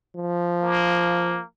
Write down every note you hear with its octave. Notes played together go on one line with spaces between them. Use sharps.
F3
A#3